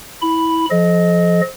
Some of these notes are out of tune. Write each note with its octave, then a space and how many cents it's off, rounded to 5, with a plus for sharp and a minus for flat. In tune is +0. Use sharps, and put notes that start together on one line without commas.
E4 -20 B5 +0
F3 +0 A4 -45 D#5 +0